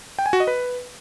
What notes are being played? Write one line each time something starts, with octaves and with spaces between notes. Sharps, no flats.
G5
G#5
F#4
D#5
B4